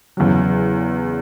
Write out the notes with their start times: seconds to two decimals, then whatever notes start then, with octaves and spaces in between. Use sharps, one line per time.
0.17 E2 C#3 F#3